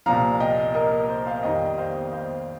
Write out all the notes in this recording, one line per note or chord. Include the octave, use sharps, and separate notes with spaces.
C2 A#2 F3 F5 A#5
D#5 G5
A#4 D#5
A#4
C5
C5 F5
F2 D#3 G3 D#5 G5
C5 F5
C5 F5